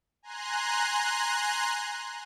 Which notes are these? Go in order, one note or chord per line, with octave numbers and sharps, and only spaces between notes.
G#5 A#5 C6 F#6